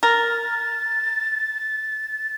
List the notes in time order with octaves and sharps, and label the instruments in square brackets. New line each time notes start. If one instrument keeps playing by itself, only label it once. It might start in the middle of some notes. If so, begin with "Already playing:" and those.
[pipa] A#4 [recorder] A6